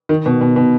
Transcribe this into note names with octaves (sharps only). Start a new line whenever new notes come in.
D#3
B2
B2
B2